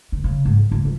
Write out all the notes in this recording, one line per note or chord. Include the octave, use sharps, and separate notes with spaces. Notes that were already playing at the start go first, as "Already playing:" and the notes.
D3
C#3
G#2
C#3
C#2
F3